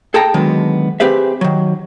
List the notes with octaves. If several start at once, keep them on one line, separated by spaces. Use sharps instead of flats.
G#4 A4 G5 A5 A#5
D3 D#3 F#3 G#3 B3
C4 G4 G#4 B4 E5
D#3 F#3